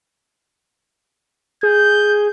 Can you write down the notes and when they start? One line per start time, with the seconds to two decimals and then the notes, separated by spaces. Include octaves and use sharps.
1.63 G#4 G6